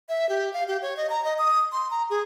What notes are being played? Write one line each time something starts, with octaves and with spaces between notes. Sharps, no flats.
E5
G4
F5
G4
C#5
D#5
A#5
D#5
D#6
C6
A#5
G#4